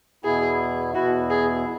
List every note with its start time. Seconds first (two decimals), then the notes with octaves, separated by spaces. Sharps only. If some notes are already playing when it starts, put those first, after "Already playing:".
0.24 E2 B2 B3 E4 G#4
0.95 E2 B2 B3 E4 F#4
1.30 G#4